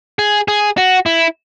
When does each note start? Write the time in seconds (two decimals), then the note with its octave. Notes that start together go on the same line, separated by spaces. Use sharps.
0.19 G#4
0.48 G#4
0.78 F#4
1.06 E4